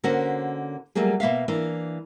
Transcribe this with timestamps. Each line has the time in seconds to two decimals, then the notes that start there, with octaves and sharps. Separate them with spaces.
0.04 D3 A#3 C#4 F#4 C5
0.95 F#3 G3 A3 A#3 G#4
1.20 B2 A#3 E5 F5
1.48 E3 A#3 D4